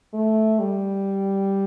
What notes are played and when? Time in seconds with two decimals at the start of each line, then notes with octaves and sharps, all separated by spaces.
0.14 A3
0.60 G3